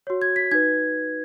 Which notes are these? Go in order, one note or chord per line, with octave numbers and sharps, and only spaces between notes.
F#4 C#5
G#6
B6
D#4 B4 G#6